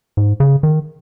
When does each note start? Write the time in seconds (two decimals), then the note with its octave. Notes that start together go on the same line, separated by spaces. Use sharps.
0.17 G#2
0.40 C#3
0.63 D#3